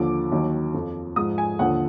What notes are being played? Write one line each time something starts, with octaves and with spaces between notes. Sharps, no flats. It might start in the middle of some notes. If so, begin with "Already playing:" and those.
Already playing: D#2 D3 F3 D6
D#2 D#3 F#3
F2 F3
G#2 F3 D#6
G#5
D#2 D3 F3 F#5